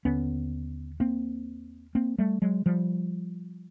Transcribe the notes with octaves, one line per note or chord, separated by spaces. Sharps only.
D#2 D3 B3 C#4
A#3 C4
A#3 C4
G3 A3
F#3 G#3
F3 G3